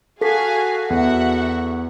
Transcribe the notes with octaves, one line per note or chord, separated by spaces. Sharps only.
F#4 G#4 A4 F5 G#5 B6
E2 E5 F#5